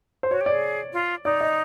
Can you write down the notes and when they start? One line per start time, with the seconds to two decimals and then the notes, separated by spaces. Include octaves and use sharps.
0.23 C5
0.30 F#4 C#5
0.41 G4
0.46 D5
0.51 G#4
0.93 F4
1.25 D#4 D5
1.41 D#5